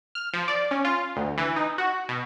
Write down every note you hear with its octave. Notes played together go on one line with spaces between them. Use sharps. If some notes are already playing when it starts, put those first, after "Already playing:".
F6
F3
D5
C#4
F4
D2
E3
D#4
F#4
B2